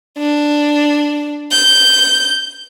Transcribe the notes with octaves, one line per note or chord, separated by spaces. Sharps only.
D4
G6